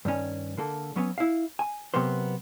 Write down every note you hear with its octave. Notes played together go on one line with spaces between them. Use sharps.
G2 D#3 C#4
D3 A#3 A4
F#3 B3 C#4
E4 F5
G#5
C3 F#3 A#3 B3 C5